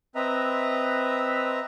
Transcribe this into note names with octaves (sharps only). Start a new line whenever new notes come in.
C4 B4 D#5 E5 A#5